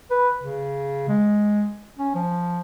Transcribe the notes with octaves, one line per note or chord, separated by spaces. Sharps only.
B4
C#3
G#3
C#4
F3